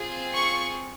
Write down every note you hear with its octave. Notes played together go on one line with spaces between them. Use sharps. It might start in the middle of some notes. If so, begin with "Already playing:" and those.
Already playing: C4 F4 G#4
C#6